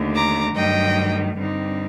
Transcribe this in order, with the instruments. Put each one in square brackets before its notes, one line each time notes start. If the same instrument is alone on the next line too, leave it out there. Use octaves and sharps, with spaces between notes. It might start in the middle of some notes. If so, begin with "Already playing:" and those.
Already playing: [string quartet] D#2 D3 A3
A#5 D6
G2 D#3 F#3 A3 D#5 G5
G2 D3 G3 C4 D#4